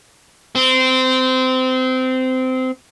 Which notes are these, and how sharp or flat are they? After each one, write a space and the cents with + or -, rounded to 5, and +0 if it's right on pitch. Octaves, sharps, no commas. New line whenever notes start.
C4 -20